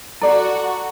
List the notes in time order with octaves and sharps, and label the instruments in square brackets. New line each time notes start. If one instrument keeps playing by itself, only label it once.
[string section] F#4 [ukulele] A4 D5 [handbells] A#5